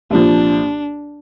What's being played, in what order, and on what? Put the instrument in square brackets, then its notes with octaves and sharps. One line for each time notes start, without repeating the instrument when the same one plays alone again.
[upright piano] C2 A#2 F3 [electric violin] D4